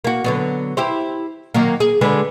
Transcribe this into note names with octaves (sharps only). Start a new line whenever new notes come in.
A#3 F#4
D3 F#3 B3
E4 G4 C5
D#3 F#3 A#3
G#4
D3 G#3 B4